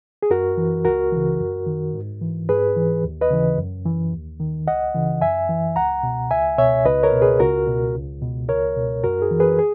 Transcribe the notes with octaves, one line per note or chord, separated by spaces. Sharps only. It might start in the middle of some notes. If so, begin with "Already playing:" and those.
G#4
F#2 F#4 A#4
E3
C#2 F#4 A#4
C#3 E3
F#2
D#3
G#2
E3
G#2 G#4 B4
E3
D#2
B4 D#5
C#3 E3
F#2
E3
D#2
D#3
C#2 D#5 F#5
C#3 E3
F#2 E5 G#5
E3
C#2 F#5 A#5
B2
C#2 E5 G#5
B2 C#5 E5
C#2 B4 D#5
A#4 C#5
B2
G#4 B4
C#2 F#4 A#4
B2
C#2
B2
C#2 A#4 C#5
B2
F#2 F#4 A#4
G#4
E3
G#4 B4
G#4